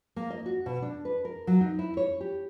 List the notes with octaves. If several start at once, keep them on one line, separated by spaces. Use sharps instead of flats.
A#3
D#5
F#4
B2
D4
B4
A#4
F#3
D#4
E4
C#5
G4